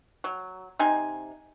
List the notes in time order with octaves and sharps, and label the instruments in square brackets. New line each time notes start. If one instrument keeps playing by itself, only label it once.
[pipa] F#3
C3 D#4 G#5